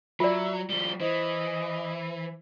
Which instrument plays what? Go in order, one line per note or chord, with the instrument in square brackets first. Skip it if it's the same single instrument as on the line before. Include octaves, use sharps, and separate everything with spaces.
[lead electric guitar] F#3 [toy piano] F4 D5 [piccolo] E5
[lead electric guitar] F3 G3 [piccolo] G7
[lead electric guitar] E3 [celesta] C5 [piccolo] D#5